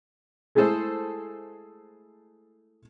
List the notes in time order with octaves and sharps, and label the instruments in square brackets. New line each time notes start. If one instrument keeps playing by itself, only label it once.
[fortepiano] G#3 A3 E4 G#4 A4 C5